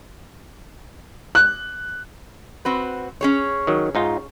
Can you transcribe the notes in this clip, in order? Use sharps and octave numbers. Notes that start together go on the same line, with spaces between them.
F#6
C4 F#4 B4
C#4 G#4 C#5
D#3 F#3
G#2 D#4 F4